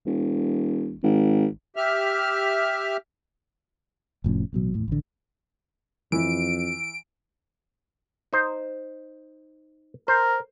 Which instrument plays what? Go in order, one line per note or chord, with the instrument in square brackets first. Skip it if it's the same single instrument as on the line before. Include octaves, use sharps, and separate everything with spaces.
[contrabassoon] E1
G#1
[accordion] G4 E5 F6
[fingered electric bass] F1 A2 F3 C#4
A1 B2 F#3
E2 A2
A1 D3
[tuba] F2 [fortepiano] E3 [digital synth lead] D7
[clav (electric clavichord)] D#4 C5
[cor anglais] A#4 [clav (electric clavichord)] C5